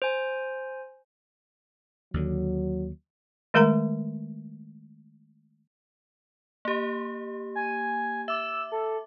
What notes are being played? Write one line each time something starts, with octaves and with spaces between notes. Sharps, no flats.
C5 G#5
D#2 D3 F#3
D#3 G#3 A3 A#4 F5 A#5
A#3 G4
G#5
E5 D6 E6
A4